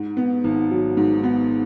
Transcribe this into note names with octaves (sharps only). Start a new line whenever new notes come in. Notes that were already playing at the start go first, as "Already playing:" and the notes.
Already playing: G#2
B3
G#1
F#3
G#2
B3